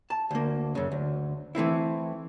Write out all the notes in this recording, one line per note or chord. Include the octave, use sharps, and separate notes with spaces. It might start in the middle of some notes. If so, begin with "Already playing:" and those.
A5
D2 A#3
F#2 C#3
D2
E3 A3 C4 E4